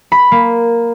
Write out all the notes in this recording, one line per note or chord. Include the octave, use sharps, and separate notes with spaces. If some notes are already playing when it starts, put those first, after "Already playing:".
B5
A#3